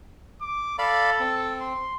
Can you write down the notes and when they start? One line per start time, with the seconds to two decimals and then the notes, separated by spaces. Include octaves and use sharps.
0.41 D6
0.79 A4 D5 F5 B5
1.20 C4
1.61 C6